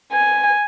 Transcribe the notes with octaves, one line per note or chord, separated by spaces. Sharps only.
G#5